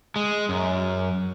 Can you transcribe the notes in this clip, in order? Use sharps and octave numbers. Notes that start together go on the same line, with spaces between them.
G#3
F#2